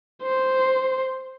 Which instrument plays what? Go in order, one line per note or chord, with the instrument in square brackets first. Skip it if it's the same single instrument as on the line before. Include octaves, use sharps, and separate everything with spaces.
[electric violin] C5